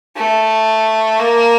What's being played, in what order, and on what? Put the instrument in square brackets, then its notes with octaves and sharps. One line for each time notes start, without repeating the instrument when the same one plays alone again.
[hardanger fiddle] A3
A#3